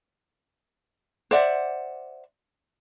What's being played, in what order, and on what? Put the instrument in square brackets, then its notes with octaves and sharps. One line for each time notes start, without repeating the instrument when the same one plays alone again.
[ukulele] C5 D5 E5 F#5